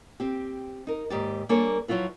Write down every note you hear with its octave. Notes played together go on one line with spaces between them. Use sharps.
C4 G4
D#4 A#4
D#2 G#2 G4 D5
G3 A#3 D4 G#4 A4 C#5
F3 F#3 E4 F4 B4